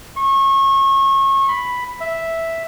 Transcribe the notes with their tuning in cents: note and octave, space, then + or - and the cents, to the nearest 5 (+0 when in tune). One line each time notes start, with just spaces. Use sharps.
C#6 -30
B5 +0
E5 +0